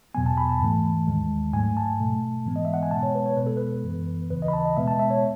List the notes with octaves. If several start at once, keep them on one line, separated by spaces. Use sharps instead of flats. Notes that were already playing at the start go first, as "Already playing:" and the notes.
E2 B2 F#3 B3 G#5
A5
B5
A5
G#2 E3 A3
D#2 D#3 G#3
G#2 F#3 A3 G#5
A5
B2 A3
G#2 E3 G#3 B3
D#5
E5
F#5
G#5
B2 G#3 B3 A5
C#5
B4
C#5
B2 G#3 B3 B4
A4
B4
F#2 E3 B3
D#2 C#3 E3 B4
D#5
B5
A5
D#5
B2 G#3 B3 E5
A5
E5
C#5